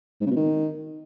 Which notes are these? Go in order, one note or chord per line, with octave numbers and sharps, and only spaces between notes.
G#2
C#3
B2
D#3